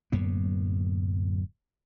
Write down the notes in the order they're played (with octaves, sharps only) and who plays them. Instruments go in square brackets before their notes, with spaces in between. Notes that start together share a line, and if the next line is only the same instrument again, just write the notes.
[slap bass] D1 F#2 A#3 B3